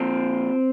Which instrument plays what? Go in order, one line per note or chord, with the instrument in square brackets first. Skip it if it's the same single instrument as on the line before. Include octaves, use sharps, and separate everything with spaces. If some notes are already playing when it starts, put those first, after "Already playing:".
Already playing: [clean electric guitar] A#2 F3 C4